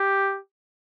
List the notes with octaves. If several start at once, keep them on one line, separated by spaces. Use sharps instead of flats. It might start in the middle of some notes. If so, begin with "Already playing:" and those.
Already playing: G4